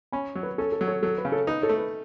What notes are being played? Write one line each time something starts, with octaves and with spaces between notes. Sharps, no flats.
C#4 G#5 B5
F#3
B4
C#4 A4
A4
F#3
A4 C#5
F#3 A4
B4
C#3
A4 C#5
D#4 B4
A4 C#5
A3
B4